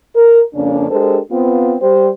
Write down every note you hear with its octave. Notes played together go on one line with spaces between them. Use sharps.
A#4
F2 C#3 A#3 C#4 D4
G#3 D4 G4 A4 A#4 C5
B3 C4 F4
G3 G4 C5